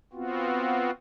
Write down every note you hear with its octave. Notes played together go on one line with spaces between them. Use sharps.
B3 C4 F4 F#4